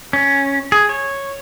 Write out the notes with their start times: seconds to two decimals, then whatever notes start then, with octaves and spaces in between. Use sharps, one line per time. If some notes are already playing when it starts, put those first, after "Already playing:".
0.13 C#4
0.72 G#4
0.89 C#5